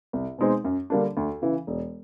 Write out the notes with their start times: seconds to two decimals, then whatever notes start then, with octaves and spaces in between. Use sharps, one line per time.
0.13 C2
0.38 B2 G#3 C4 D#4
0.64 F#2
0.90 D3 G3 A#3 D4
1.17 D2
1.42 C#3 E3
1.67 E1